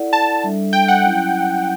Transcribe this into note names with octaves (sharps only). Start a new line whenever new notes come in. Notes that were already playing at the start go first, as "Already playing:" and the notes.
Already playing: E4 A4 D5 F#5
A5
G3 D4 A4 E5
G5
F#5
F#3 C#4 E4